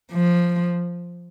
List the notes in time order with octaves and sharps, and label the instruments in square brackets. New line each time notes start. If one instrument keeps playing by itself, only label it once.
[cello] F3